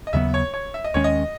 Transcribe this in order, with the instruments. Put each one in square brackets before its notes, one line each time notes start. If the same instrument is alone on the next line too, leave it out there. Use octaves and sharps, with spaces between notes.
[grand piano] D#5
[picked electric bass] D#2 C#3 F#3 B3 [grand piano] E5
[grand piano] C#5
C#5
E5
D#5
[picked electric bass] D#2 D#3 G#3 C#4 [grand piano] C#5
[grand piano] D#5